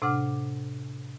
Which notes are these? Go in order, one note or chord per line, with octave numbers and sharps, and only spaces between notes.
A2 C3 D4 F#5 D6 F6